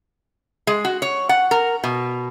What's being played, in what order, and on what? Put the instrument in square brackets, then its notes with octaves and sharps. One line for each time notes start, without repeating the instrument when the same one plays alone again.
[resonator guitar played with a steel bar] G#3
F#4
C#5
F#5
A#4
B2